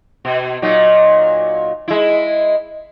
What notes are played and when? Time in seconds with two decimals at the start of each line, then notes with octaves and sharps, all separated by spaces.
0.25 B2
0.62 A#2 F#3 D#4
1.88 G#3 E4